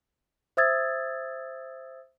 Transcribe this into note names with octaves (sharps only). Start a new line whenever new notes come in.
C5 E5 D#6 E6 G#6 A6